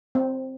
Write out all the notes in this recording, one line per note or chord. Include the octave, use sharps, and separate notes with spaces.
C4